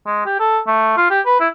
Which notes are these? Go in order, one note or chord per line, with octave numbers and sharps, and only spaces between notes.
G#3
G4
A4
A3
F4
G4
B4
E4